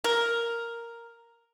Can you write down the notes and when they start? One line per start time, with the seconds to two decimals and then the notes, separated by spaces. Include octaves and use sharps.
0.04 A#4